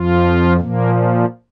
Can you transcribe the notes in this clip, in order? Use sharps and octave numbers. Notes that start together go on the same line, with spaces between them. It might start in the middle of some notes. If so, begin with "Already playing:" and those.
Already playing: F2 F3 F4
A#2 F3 A#3